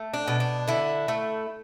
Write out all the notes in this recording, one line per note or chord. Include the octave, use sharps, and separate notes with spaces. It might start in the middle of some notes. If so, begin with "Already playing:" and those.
Already playing: A3
D4
B2
D4
D3 E4
A3